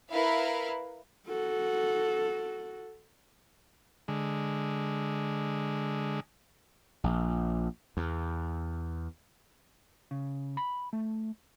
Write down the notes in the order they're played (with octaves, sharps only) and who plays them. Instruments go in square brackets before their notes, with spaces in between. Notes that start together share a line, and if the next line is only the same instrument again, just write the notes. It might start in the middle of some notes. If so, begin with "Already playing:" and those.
[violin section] E4 A#4 B4 F5
[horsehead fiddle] F#4 A4
[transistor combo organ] D3 G#3
[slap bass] A#1
E2
[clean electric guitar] C#3
B5
A3